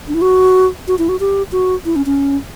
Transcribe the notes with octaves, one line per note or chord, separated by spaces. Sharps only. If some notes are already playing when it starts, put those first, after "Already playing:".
D4
E4
F#4
F#4
E4
F#4
G4
F#4
E4
C#4
C#4